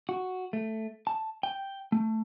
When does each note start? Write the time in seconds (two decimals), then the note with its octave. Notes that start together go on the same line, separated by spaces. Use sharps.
0.09 F#4
0.53 A3
1.07 A5
1.43 G5
1.92 A3